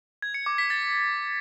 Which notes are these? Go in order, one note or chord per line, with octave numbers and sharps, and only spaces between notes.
G#6
C#7
D6
B6
A6